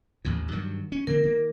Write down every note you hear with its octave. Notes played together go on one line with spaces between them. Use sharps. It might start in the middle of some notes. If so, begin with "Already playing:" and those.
A1 D#2 A2
G2 D#3 F#3
C#4
D3 A#3 C4 A#4
D#3 A#3